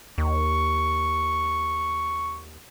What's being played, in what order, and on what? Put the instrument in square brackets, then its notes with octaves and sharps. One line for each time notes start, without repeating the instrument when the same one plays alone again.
[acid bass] D#2 [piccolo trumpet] C#6